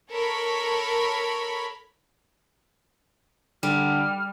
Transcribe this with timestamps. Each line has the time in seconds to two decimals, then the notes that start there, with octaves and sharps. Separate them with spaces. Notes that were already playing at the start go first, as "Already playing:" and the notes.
0.11 A4 A#4 C#5 B5
3.63 D3 G3 F6